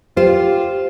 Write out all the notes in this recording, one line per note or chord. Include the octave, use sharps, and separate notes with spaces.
F4 G4 C5